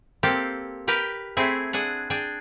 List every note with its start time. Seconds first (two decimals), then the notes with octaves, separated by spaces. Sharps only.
0.23 A#3 C4 G4 A4
0.87 G4 A#4 B4 G5
1.37 A3 C4 E4 G#4
1.73 D4 G#4 F#5
2.10 D4 G#4 G5